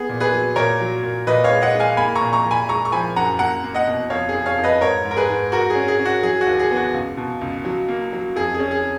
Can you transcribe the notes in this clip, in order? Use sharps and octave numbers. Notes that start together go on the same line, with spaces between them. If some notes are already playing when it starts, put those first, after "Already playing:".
Already playing: B3 G#4
A#2
G#4 B4
F#3
A#2 A#4 C#5
F#3
A#2
A#2 B4 D#5
C#5 F5
G#3
D#5 F#5
G#3
F5 G#5
A#3 G#5 B5
A#5 C#6
A#2
A#5 C#6
A#2
G#5 B5
G#3 A#5 C#6
C#6
F3 G#5 B5
F#2 F#5 A#5
A#3 F#5 A#5
A#3
D#5 F#5
B2
F2 C#5 F5
G#4
F2
C#5 F5
F2
B4 D#5
G#2 A#4 C#5
G#2
A#4
G#4 B4
G#2
G#3 F#4 A#4
G#4
C#4
G#4
C#4
F#4
F#3 G#4
F#4
D#2
G#4
B3
F#4
C#2
B2
C#2
F#3
A#3
F#3
F2 G#4
G#4
C#4
G#4